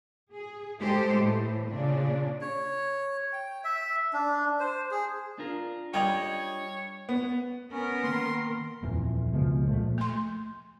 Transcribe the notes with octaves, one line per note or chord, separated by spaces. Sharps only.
G#4
G#3 G4 A4 C5
A2 E3
A#2 C#3 D4
C#5
G5
E5
D4
C5
G#4
D4 F4 A#4
G3 C#5 D#5 G5 G#6 F7
B3
B3 C#4 A#4
D#3 A#3 C6
D#1 F2 E3
C#2 B2 F3 G#3
A#2 F3 G3 A3
A3 C6